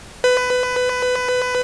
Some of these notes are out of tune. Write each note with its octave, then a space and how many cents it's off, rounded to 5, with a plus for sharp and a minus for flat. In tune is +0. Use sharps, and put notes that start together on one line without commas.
B4 +20